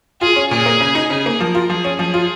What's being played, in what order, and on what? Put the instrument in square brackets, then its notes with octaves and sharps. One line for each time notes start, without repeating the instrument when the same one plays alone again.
[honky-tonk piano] F4 [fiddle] G#4
[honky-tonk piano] C#4
[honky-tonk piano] A#2 [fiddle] G#4
[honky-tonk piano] A#3
C#3
D#4
[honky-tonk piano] C#3 [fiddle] G#4
[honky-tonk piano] A#3
[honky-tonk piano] F3 [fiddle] A#4
[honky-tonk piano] F4
[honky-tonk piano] F3 [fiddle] G#4
[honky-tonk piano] C#4
[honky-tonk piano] F3 [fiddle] G#4
[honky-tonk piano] F4